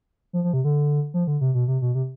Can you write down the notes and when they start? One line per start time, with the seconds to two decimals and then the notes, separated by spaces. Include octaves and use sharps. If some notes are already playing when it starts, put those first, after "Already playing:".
0.33 F3
0.44 F3
0.53 C3
0.64 D3
1.14 F3
1.27 D3
1.41 C3
1.55 B2
1.68 C3
1.82 B2
1.95 C3